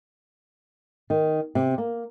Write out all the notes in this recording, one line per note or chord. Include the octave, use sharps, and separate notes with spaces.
D#3
C3
A#3